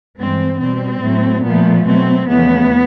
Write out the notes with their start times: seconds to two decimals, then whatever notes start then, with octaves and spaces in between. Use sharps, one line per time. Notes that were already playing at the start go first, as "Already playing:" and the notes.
0.18 G2 E3 G#3 C4
0.61 B2 G3 C4
1.02 A2 F#3 A3
1.44 A#2 F3 A3 B3
1.85 B2 F#3 A3 C4
2.27 E2 C#3 F3 A3 B3